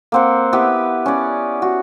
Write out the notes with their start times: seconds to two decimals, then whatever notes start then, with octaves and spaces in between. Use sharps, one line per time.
0.12 A#3 C4 F#5
0.53 B3 E4 G4 B4
1.06 C#4 D5
1.62 F#4